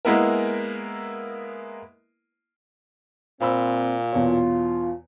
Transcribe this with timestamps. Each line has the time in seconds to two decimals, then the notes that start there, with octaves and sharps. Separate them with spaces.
0.05 G#3 A#3 B3 E4 A#4
3.41 A#2 C4 C5 B5 E6
4.12 E2 B2 F4 C#5